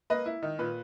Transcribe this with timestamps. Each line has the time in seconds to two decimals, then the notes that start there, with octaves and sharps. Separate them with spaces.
0.10 A#3 B4 D#5
0.26 E4
0.43 D#3
0.59 A#2 B4